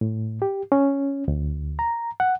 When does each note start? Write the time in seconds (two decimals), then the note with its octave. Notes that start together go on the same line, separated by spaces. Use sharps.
0.01 A2
0.42 G4
0.72 C#4
1.28 D2
1.79 A#5
2.20 F#5